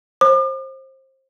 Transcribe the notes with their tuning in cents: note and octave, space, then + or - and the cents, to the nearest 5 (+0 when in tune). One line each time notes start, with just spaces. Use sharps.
C5 +25 D6 +45